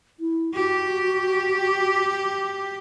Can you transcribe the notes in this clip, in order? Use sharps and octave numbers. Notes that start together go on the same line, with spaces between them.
E4
F#4 G4